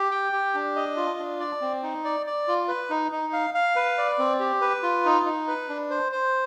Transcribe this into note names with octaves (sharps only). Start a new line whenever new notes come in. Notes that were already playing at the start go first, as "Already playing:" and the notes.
Already playing: G4
G5
G4
D4
D#5
F4
D4
D5
C4
D#4
D5
D5
F4
B4
D#4
D#4
F5
F5
B4
D5
C4
G4
B4
F4
D#4
D#4
B4
D4
C5
C5